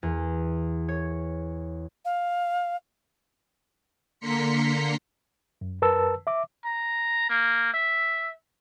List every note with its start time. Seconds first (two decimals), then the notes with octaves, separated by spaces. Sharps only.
0.03 E2
0.88 C#5
2.05 F5
4.20 D3 A#3 A#5 C6 B6 C#7
5.61 F#2
5.82 F#2 A#4 B4 A5 E6
6.27 E5 D6
6.65 A#5
7.30 A#3
7.74 E5